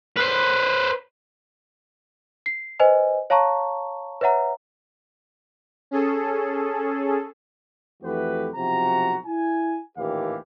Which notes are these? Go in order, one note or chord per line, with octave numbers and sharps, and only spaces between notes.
B4 C5
C7
B4 C5 D#5 G#5
C#5 F5 A5 A#5 C#6
B4 C#5 E5 F#5 A#5
C#4 G#4 A4
F2 E3 A3 F#4 G4 B4
B1 C3 F3 F#4 A#5
E4 G#5
A1 D#2 A#2 E3 G4 F5